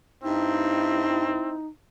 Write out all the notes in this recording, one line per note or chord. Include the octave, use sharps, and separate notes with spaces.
G2 C4 D#4 E4